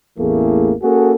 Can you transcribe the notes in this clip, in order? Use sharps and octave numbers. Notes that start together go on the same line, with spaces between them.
A1 E2 E3 A3 A#3 G#4
A#3 C#4 F#4 G#4 A4